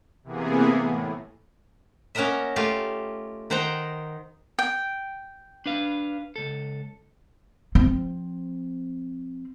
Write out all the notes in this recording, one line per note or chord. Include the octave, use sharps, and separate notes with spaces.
C3 E3 A#3 B3 G#4
A2
A#3 C#4 F#4 A#4 D#5 E5
A3 F4 G4 F5
D#3 D#4 C5 F#5 G5 A#5
G5
D4 B4 F5
C#2 A4
F3 C4